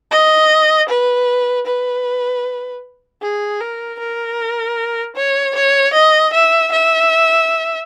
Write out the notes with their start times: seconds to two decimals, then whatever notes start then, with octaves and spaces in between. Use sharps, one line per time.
0.11 D#5
0.89 B4
1.66 B4
3.22 G#4
3.60 A#4
3.99 A#4
5.16 C#5
5.55 C#5
5.93 D#5
6.33 E5
6.72 E5